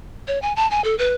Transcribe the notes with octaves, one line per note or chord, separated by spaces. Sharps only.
C#5
G#5
A5
G#5
A4
B4